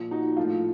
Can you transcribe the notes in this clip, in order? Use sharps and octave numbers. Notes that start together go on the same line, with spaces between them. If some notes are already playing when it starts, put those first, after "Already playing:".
Already playing: A#2 F3
D#4 F#4
A2 F3 F4